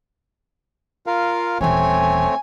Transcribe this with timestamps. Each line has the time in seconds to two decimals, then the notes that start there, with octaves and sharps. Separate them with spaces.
1.07 F4 A#4 F5
1.61 D#1 E3 A3 C4 C#5 G#5